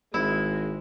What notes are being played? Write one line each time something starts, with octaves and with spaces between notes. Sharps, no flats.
G#1 G#3 E4